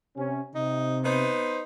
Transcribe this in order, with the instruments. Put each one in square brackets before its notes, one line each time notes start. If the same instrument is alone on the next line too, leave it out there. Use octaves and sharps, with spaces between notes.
[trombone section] C3 C#4
[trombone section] C3 [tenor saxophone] D#4
[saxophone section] B3 D#4 B4 [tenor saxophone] C5